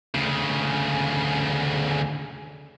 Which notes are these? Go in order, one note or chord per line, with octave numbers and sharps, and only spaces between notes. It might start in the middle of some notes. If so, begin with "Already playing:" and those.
D2 C#3